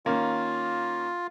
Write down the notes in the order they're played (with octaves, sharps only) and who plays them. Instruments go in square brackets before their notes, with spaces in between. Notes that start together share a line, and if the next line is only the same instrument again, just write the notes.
[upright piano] D#3 A#3 C#4 [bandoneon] F4